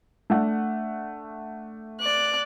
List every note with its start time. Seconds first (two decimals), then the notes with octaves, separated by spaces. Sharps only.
0.30 A3 D4 F#5
2.01 D5 F#6